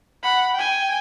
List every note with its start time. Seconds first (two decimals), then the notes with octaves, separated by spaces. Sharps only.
0.23 F#5 B5
0.54 G5 G#5